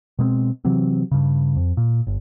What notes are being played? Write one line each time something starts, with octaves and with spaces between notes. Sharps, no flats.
B2 G#3 A#3 C4
C3 E3 F#3 C4
G2 C#3
F2
A#2
G1